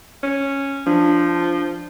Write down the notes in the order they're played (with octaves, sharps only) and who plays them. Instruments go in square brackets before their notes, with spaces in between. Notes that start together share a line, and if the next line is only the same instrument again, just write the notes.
[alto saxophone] C#4
[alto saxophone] F3 [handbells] D4